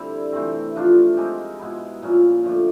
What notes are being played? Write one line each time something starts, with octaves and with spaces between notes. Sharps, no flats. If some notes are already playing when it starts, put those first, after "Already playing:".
Already playing: D3 G3 C4 E4
C3 E3 A3 C4
F3 A3 D4 F4
G#3 C4 D#4 G4
B2 G#3 B3 E4
A#2 F3 A#3 C#4
D3 F3 A3 D4